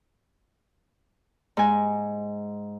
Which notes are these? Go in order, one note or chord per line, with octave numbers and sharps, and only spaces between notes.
G#2 G#5